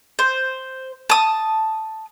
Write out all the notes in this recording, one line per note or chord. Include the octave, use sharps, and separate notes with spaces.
C5
A5 D#6